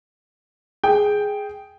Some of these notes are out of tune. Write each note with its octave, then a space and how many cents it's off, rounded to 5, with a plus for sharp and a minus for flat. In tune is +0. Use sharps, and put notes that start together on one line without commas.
G#4 +0 G5 +0